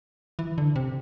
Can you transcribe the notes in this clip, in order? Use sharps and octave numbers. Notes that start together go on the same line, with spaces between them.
E3
D3
C3